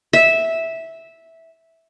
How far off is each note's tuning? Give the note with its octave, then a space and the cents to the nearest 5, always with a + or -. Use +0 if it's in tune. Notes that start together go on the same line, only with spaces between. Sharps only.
E5 -10